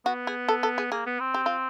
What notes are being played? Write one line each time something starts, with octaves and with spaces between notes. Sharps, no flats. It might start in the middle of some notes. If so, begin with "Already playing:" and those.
B3 F#4
G#4
A4
A4
G#4
A#3 G#4
B3
C4
G4
F4